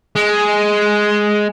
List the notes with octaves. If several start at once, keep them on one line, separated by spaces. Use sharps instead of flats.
G#3